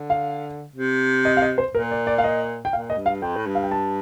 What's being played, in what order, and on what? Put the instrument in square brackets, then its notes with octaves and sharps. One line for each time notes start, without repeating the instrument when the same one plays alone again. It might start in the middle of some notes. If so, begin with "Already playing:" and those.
Already playing: [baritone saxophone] D3
[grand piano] F5
[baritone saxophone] C3
[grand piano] D#5
F5
D#5
C5
[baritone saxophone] A#2 [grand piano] A#4
[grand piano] D5
D5
F5
D#5
G5
[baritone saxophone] A#2 [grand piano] F5
[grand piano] D#5
[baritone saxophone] G2
[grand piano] F5
[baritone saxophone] F2 [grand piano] G5
[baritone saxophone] A2
G2
[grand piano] F5
G5
A5